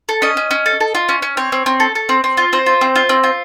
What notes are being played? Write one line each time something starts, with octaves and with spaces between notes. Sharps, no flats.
A4
C#4 D#5
C#4
C#4
A4
A4
F4
C#4
C#4
C4 C#5
C4
C4
A4
A4
C4
C4
F4
C4 C5
F4
C4
F4
C4
F4